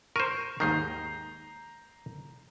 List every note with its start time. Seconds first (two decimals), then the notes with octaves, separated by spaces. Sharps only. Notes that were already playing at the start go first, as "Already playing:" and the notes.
0.16 A#4 C5 C#6 D#7
0.60 D#2 G#2 D#3 A#5 G6 C7